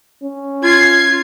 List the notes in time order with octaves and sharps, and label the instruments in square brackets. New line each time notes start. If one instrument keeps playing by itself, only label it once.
[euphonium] C#4
[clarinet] F4 [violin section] G#6 C7